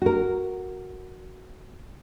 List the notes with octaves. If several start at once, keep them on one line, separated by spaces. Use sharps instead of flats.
F#4 A#4